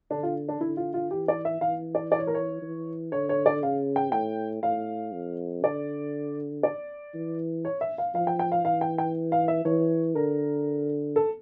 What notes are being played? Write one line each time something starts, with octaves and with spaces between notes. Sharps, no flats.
D3 D4
F4
D4
D3 E4
F4
F4
E3 G4
D5
E5
E3 F5
D5
D5
C#5
A#4
C#5
E3
D3 C#5
C#5
D5
C#3 F5
G5
A2 G5
A2 F5
F2
D3 D5
D5
E3
C#5
E5
F5
F3 F5
G5
G5
F5
E3 F5
G5
G5
F5
E5
E3 C#5
D3 A#4
A4